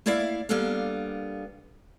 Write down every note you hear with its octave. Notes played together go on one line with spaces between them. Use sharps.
A3 A#3 E4 D5 E5 F5
G3 A#3 B3 D4 A4 F5